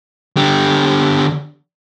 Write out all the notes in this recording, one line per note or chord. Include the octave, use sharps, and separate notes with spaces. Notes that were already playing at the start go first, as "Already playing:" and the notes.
D3 G4